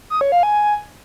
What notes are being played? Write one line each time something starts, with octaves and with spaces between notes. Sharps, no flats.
D#6
C#5
F5
G#5